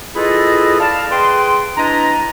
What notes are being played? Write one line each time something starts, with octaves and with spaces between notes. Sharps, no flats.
E4 F4 G#4 A4 B4 D#5
D5 F5 A5
G#4 B4 G5 C6
D4 E4 B4 D#5 A#5